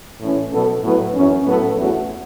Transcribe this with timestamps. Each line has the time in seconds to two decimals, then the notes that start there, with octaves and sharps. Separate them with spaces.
0.20 A2 E3 C#4
0.52 B2 F#3 B3 A4
0.83 A2 F#3 B3 E4 B4
1.14 F#2 E3 C#4
1.46 A2 F#3 B3 A4
1.78 E2 E3 A3 C#4 F#4